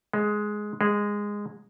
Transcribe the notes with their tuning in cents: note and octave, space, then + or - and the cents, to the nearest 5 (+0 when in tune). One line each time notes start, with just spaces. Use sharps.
G#3 +10
G#3 -10